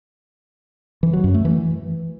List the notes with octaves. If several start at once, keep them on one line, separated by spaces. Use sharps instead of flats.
E3
F#3
F#2
A3
E3